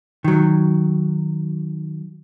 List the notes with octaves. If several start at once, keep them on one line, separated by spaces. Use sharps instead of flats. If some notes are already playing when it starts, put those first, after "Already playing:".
D#3 F#3